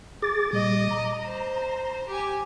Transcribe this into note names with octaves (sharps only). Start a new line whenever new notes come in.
G#4 D6 A6
A#2 G3 D#5 D6
A#5
C5
G4 G#5